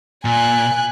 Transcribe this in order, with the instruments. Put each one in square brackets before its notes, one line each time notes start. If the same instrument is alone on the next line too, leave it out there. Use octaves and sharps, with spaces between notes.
[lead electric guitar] A#2 [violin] G#5 F#6